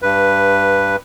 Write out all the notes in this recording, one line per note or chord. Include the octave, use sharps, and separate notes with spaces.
G2 B4